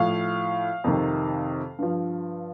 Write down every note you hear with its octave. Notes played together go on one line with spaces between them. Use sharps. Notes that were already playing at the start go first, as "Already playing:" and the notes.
Already playing: A2 F3 F5
F2 C3 D#3
G2 F3